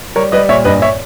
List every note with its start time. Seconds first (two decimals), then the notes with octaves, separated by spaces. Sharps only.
0.16 G3 A#4 C#5
0.32 G3 B4 D#5
0.49 A#2 C#5 E5
0.65 G2 B4 D#5
0.82 C#5 E5